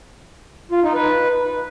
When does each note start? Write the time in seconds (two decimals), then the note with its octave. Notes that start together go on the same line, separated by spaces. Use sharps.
0.72 F4
0.83 D#4
0.94 B4